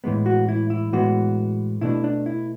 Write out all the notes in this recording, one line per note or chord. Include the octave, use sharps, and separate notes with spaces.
A2 E3 G#3 B3
F#4
E4
E4
A2 E3 G#3 B3 F#4
B2 A3 D4 E4
D4
E4